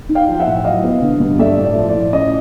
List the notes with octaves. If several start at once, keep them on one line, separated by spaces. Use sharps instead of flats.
D#4
F5 G5
F3
E5 F#5
A2
F#3 D#5 F5
B3
D3
G2
A3 D5 E5
A2
D5
F3
D5
A2
C#4 D#5